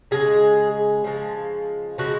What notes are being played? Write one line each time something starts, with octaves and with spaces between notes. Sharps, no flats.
C#3 G#3 G#4
C#3 F3 G#3
C#3 F3 G#3 F#4